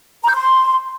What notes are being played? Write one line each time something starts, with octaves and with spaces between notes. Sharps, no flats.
A#5
G6
C6